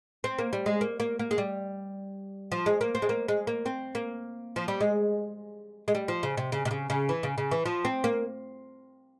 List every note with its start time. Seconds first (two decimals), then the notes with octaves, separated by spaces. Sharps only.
0.24 C4
0.39 A#3
0.53 G3
0.66 G#3
0.81 A#3
1.00 A#3
1.19 A#3
1.31 G#3
1.38 G3
2.52 F3
2.66 G#3
2.81 A#3
2.95 C4
3.02 G#3
3.09 A#3
3.28 G#3
3.47 A#3
3.66 C4
3.95 A#3
4.56 F3
4.68 G3
4.81 G#3
5.88 G#3
5.95 G3
6.08 F3
6.23 C#3
6.37 C3
6.52 C#3
6.65 C3
6.71 C#3
6.90 C#3
7.09 E3
7.23 C#3
7.38 C#3
7.51 E3
7.65 F3
7.85 C4
8.04 A#3